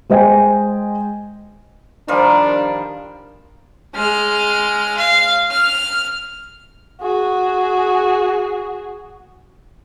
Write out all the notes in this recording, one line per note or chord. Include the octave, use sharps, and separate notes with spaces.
G#3 C5 D#5 G5 G#5
D#3 F3 G3 D4
G#3 F6
F5
F6
F#4 G#4